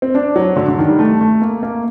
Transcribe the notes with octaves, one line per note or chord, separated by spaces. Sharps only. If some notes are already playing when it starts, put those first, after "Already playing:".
C4
D4
F#3
D3
D3
D#3
G3
A3
A3
A#3
A#3